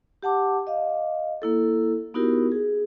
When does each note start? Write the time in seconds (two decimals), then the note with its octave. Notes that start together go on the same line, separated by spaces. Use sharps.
0.23 G4 F#5 A5 D6
0.67 D#5 F5
1.42 A#3 E4 A4
2.14 B3 D#4 E4 F#4 G4 A#4
2.52 G#4